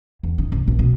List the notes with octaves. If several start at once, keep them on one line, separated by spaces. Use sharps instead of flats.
E2
D#3
C2
A#1
B2